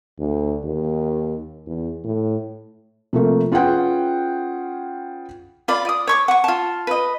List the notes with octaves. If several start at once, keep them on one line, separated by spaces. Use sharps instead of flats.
D2
D#2
E2
A2
C3 F3 A3 A#3
C#4 F4 G#4 B4 F#5 G5
F4 D5 B5
D5 D#6
C#5 C#6 D6
F#5 C#6
F4 A5
B4 D#5